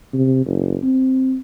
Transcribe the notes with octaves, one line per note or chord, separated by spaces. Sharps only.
C3
F#1
C4